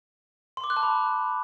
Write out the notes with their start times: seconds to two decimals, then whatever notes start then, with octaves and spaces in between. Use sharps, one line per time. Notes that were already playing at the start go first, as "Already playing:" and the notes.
0.57 C6
0.64 D6
0.70 F#6
0.77 A5
0.83 B5